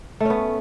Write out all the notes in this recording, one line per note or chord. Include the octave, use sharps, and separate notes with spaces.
A3 B3 C#4